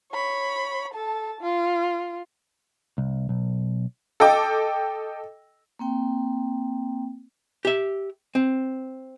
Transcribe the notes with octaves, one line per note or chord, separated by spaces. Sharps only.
C#5 B5
A4 A5
F4
C2
B1
A4 D#5 G5 D6
A#3 C4 G5
G4 E5
C4